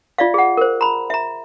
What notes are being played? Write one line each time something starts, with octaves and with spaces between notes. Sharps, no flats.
F4 D5 E5 F5
G#4 F#5
A#4 C5
A#5 B5
E5 A#5